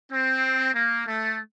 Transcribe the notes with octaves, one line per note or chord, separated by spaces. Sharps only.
C4
A#3
A3